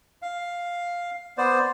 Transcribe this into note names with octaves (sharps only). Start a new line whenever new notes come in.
F5
B3 C5 D5